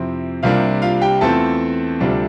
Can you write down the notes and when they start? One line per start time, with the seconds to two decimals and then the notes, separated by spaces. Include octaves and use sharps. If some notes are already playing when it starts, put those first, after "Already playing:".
Already playing: F2 C3 F3 C4 E4
0.43 C2 C3 G3 A#3 D4 F4 F5
0.82 F4 F5
1.02 G4 G5
1.21 E2 E3 A3 C4 F4 A4 A5
2.00 D2 C3 G3 D4 F4